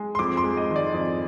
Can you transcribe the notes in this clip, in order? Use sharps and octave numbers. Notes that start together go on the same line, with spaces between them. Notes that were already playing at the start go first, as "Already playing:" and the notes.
Already playing: G#3
C6
F2 D6
C6
G#3
D#5
D#3
D5
F2